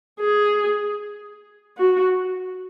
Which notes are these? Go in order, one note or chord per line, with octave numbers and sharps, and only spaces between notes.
G#4
F#4